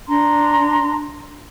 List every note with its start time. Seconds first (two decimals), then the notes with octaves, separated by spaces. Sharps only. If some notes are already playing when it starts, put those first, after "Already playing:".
0.07 D4 A#5 C6